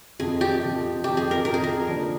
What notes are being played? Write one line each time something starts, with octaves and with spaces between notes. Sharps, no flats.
F2 C3 F3 G#4
G4
F2 C3 F3
F2 C3 F3 G4
G#4
A#4
F2 C3 F3 A#4
G#4
A#4
D3 F3 A#3 D4